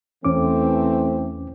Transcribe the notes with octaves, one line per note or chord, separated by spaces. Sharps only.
E2 E3 A3 C4 C#4 D6